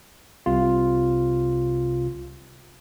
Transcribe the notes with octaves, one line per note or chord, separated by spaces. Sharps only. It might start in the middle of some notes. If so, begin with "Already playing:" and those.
C2 C3 F4